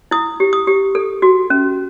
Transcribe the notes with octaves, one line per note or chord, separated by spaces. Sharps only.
E4 D#6
G4
D#6
G4
A4
F#4
C#4